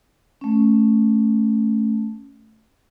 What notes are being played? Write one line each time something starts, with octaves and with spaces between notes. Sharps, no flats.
A3 C#4